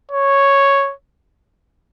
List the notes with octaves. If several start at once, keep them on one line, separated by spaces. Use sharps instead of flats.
C#5